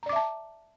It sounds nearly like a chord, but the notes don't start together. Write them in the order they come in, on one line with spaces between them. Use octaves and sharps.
A#5 D5 D6 E5 A5